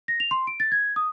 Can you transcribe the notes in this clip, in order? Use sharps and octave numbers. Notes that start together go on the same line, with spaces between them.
A#6
F7
C6
D7
A6
G#6
D#6